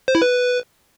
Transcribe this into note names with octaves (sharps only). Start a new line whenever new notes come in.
C5
E4
B4